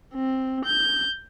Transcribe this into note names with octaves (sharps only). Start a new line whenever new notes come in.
C4
G6